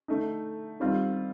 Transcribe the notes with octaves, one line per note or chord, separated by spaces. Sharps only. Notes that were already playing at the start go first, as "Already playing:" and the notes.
D3 A3 D#4
D#3 G3 C4 F4